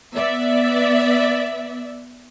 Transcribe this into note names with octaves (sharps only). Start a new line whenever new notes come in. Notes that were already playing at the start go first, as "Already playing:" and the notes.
B3 D5 E5